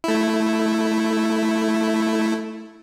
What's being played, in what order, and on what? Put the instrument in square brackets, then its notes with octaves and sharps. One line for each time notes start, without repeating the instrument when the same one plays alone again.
[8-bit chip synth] A3 E4